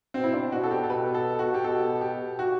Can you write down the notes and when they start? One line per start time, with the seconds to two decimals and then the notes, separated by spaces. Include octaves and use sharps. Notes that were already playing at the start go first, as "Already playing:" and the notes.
0.14 B2 C4
0.24 E4
0.33 D4
0.52 B2 F#4
0.63 A4
0.71 G4
0.84 A4
0.90 B2 B4
1.14 A4
1.39 F#4
1.54 G4
1.64 B2 A4
2.01 G4
2.39 F#4